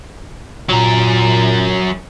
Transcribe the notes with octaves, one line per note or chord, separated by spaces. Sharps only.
A#2 F#3 A#4